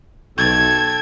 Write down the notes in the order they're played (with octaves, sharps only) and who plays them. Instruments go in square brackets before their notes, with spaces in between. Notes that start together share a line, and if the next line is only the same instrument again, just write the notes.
[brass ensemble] B1 [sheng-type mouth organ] A4 G5 A5 [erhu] G#6